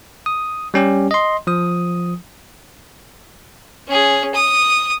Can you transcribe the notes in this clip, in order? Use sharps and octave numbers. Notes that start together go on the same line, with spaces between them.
D#6
G3 C#4 G4
D#5 C6
F3 D#6
C#4 G#4
D#6